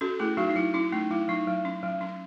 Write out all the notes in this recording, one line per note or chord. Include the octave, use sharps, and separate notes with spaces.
C#4 F#4 A4
A3 E4 G#4
F#3 D#4 F#4
D#4
F#3 E4
C#4 E4
A3 D#4
F#3 E4
F#3 D#4
F#3
C#4
F#3
C#4